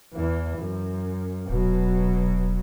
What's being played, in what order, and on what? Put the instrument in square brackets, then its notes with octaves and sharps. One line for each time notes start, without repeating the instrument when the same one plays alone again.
[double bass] E2 E3
F#2
[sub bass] D#1 [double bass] B2 F#3